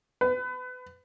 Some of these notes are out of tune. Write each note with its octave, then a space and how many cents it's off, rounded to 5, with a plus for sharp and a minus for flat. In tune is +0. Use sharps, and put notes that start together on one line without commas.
B4 +30